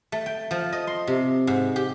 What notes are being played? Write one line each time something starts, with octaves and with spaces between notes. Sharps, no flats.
A3
G5
F3
D#5
C6
C3
G#2
G4